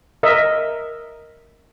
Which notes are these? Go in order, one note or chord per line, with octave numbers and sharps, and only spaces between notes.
A#4 D#5 E5